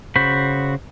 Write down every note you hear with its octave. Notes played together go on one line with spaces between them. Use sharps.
C#3 F#4 C5 B5